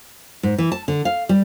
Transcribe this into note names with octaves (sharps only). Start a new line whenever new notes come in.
G#2
E3
A5
D3
F5
G3